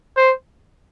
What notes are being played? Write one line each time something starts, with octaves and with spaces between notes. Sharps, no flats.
C5